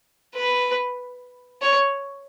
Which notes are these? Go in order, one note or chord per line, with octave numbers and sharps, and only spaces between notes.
B4
C#5